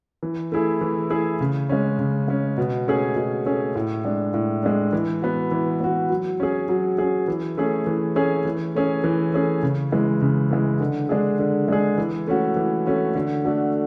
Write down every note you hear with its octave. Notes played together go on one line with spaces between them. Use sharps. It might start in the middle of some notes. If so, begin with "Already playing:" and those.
E3
A3 E4 G#4
E3
A3 E4 G#4
C#3
G#3 C#4
C#3
G#3 C#4
B2
A3 C#4 G#4
B2
A3 C#4 G#4
A2
G#3 D4
A2
G#3 D4
E3
B3 F#4
E3
B3 F#4
F#3
C#4 G#4
F#3
C#4 G#4
E3
A3 C#4 G#4
E3
A3 C#4 G#4
E3
A3 C#4 G#4
E3
A3 C#4 G#4
C#3
E3 G#3
C#3
E3 G#3
D3
G#3 D4 G#4
D3
G#3 D4 G#4
E3
A3 C#4 F#4
E3
A3 C#4 F#4
D3
A3 D4 F#4